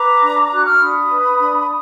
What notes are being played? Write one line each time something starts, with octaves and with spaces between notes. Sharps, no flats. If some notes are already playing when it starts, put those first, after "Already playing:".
Already playing: B4 A#5 D6
D4
F#4 F#6
F6
D4 B5 D#6
B4
D4